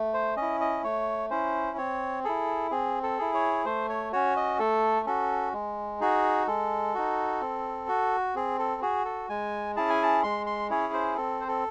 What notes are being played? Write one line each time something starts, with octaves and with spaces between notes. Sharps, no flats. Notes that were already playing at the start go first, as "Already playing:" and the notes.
Already playing: A3
C5
C#4 D#5
E4
D#5
A3 C#5
C#4 E4 C5
C4 C#5
E4 G#4 A4
C4 G#4
A4
E4 G#4
C#5
A3 C5
C#5
C#4 F#4 C#5
D#5
A3 A4
C#4 F#4 A4
G#3
D#4 F#4 G#4
G#3 A4
D#4 F#4
C4
F#4
C4 G#4
A4
F#4 G#4
A4
G#3 G#5
C#4 E4 G#4 A5
G#5
A5
G#3 C6
C6
C#4 E4 G#4 C#5
C5
C4 A4
C5
A4